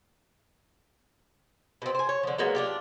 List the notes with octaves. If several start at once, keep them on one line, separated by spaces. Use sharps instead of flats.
B2 C4
C5 G#5
C#5
D3 F3
F#3 G#3 A#3 B3
D4 F4 G4